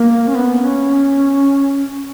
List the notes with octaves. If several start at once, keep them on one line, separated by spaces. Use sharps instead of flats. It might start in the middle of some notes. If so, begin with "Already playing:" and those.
Already playing: A#3
C#4
B3
B3
C#4